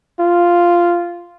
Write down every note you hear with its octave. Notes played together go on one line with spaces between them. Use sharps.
F4